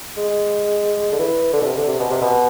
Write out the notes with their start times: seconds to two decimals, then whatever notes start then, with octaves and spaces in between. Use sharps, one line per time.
0.17 G#3
1.12 D3
1.19 E3
1.53 D3
1.61 B2
1.65 C3
1.77 D3
1.88 C3
1.99 B2
2.10 C3
2.22 B2